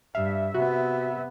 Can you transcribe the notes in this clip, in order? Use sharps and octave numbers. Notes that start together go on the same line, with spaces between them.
G2 E5 F5
C3 B3 F#4